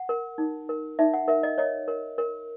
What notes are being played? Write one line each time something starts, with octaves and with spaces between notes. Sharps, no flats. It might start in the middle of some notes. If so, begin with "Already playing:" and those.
Already playing: F#5
A#4
D#4
A#4
D#4 E5
F#5
A#4 E5
D#5
C#5 D#5
A#4
A#4